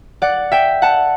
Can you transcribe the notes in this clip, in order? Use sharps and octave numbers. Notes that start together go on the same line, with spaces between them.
D5 F#5
E5 G5
F#5 A5